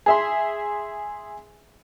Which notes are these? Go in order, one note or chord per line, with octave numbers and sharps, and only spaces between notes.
G#4 E5 C6